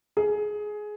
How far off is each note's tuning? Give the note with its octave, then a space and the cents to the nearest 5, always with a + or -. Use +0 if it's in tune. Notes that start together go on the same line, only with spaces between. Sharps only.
G#4 +15